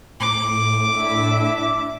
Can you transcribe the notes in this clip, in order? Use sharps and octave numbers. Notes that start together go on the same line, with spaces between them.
A2 D6
D4 E4 E5